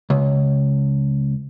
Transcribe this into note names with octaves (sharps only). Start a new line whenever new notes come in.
C#2